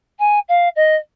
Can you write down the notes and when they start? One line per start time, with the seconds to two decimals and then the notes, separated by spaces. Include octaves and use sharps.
0.19 G#5
0.48 F5
0.76 D#5